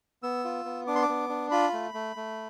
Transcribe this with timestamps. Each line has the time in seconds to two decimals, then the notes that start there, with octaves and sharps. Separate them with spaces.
0.23 B3 E6
0.45 F4
0.65 B3
0.87 D4 D6
0.95 C6
1.02 D6
1.09 B3
1.29 D4
1.51 F4 B5
1.73 A3
1.94 A3
2.16 A3